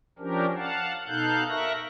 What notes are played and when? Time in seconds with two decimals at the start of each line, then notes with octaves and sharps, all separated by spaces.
0.19 F3 C#4 D4 G4 A#4
0.56 F5 F#5 A5
1.08 B2 D#4 A4 F5 F#6 G6
1.49 A#4 E5 C#6 F#6 A#6